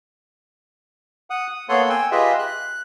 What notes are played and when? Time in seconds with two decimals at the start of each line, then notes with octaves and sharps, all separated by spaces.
1.30 F#5 D#6
1.48 D#6
1.69 A#3 B3 A4 C#5 F#5 C6
1.89 G5 G#5 E6
2.11 F4 G4 G#4 B4 D#5 E5
2.39 F#6